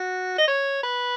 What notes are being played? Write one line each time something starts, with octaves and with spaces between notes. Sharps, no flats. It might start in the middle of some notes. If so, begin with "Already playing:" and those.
Already playing: F#4
D#5
C#5
B4